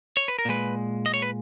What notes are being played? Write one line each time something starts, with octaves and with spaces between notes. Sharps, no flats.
C#5
B4
A#4
A#2 G#3 B4
D#5
C#5
B4